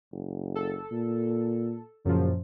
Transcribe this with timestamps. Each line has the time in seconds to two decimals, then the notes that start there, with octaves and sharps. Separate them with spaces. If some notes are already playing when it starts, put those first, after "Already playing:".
0.12 F#1
0.55 A4
0.91 A#2
2.05 F#2 A#2 C#3 F3